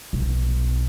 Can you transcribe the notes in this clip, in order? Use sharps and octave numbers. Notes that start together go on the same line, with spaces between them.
B1